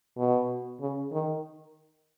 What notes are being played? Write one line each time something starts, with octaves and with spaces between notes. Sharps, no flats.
B2
C#3
D#3